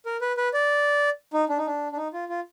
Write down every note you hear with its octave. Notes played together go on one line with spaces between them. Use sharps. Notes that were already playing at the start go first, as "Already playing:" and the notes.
A#4
B4
B4
D5
D#4
D4
D#4
D4
D4
D#4
F4
F4